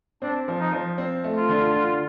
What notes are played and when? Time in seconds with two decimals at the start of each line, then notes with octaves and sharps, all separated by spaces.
0.22 C4 D4
0.48 F3
0.60 D#4
0.72 F3
0.98 C4
1.24 A3
1.36 F4
1.49 D3
1.75 D3